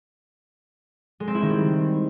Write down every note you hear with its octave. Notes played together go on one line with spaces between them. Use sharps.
G#3
C4
E4
D#3
G3